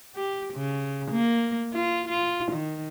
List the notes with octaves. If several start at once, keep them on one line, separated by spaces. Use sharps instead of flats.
G4
C#3
A#3
F4
F4
D#3